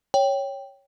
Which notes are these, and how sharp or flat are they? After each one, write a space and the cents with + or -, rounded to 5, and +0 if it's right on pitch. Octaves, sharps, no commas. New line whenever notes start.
C#5 +0 G5 +0